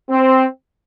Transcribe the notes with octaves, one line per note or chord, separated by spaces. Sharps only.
C4